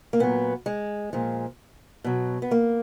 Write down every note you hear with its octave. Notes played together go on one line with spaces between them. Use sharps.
A#3
A#2 F#3 B3
G#3
A#2 F3 G#3
B2 F#3
B3
A#3